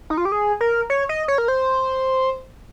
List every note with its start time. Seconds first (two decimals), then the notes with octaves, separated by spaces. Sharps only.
0.10 D#4
0.18 F4
0.25 G4
0.32 G#4
0.61 A#4
0.90 C#5
1.09 D#5
1.28 C#5
1.38 A#4
1.48 C5